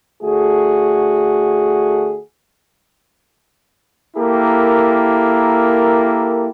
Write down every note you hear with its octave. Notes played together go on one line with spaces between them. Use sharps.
D3 A3 F#4 G#4
A#3 E4 G4 A4 A#4